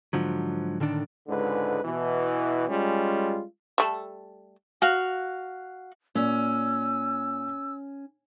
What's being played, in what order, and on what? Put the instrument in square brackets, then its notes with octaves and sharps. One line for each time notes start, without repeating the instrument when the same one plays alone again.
[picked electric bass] G#2 D3 F3 F#3
A2 D3 D#3 D4
[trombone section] C#2 G#2 D3 B4
B2 E3
G3 G#3 C#4 F4
[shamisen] G3 A3 A4
[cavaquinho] F#4 F5
[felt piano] A#2 D5 [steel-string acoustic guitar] C#4 [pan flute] E6